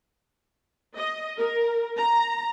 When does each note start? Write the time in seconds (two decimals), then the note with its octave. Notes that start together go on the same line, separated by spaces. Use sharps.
0.96 D#5
1.38 A#4
1.98 A#5